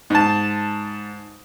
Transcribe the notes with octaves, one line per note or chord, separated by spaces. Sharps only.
G#2 A5